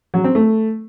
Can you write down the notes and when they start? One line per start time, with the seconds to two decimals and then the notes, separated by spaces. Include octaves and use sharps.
0.14 F#3
0.24 C4
0.35 A3